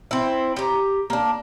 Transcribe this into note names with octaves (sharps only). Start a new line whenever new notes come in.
C4 E4
G4 A#5
A#3 D4